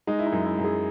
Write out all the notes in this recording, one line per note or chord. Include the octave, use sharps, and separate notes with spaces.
G#3 D#4
E4
D#4
F#2
E4
F#2
G#4